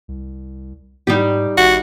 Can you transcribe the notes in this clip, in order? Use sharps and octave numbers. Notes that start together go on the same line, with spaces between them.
C2
G#2 G3 D#4 G4
G#1 F#4